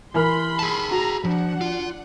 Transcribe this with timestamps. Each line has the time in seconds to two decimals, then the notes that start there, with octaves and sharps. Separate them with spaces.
0.14 E3 A#4 B5 C6 F6
0.59 G#4 A5
0.91 F#4 A#5 B5
1.25 F3 D4 F#5
1.61 F4